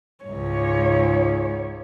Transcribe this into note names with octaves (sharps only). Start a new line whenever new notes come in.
C#2 G#2 C#5